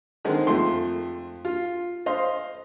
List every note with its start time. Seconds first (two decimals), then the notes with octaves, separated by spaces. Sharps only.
0.25 D3 D#3 G#3 C4 D#4
0.47 F2 A3 C6
1.45 F4
2.06 C5 D#5 F5 C6